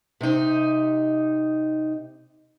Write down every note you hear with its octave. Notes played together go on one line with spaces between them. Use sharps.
C3 D#4